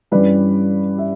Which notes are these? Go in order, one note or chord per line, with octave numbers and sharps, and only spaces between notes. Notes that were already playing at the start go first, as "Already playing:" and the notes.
G2 E3 G3 C#4 B4 D5
E5